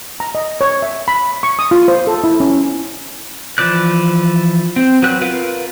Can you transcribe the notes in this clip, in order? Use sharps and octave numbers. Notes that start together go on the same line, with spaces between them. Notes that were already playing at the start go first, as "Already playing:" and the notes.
A#5
D#5
C#5
E5
B5
C#6
D#6
F4
C5
A4
E4
C#4
E3 F3 D5 F#6
C4
F#3 B4 F#6
F4 A#4 B4 F5